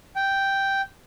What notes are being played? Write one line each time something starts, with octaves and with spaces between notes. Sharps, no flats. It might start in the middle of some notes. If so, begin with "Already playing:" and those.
G5